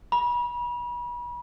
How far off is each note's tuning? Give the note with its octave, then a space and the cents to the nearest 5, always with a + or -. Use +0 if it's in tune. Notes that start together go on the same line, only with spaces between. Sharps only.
B5 -35